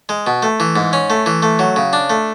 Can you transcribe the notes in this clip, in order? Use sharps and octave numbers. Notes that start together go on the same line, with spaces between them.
G#3
B2
A3
E3
G#2
C#4
A3
E3
A3
F#3
C#3
D4
A3